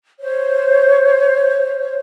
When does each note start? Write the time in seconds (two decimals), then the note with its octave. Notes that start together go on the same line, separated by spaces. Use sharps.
0.20 C5 C#5